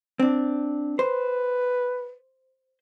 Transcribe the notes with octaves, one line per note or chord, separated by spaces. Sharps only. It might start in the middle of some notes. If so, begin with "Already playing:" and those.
C4 D4
B4 C5